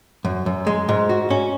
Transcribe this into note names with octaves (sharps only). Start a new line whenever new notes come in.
F#2
F#2
G#3
G#2
F#4
C#4